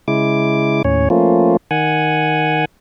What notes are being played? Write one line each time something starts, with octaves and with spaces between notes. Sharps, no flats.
C#3 G#3 E4 D6
D#2 A2 C#4 C#5
F3 A3 A#3 C#4 F4
D#3 F#5 G#5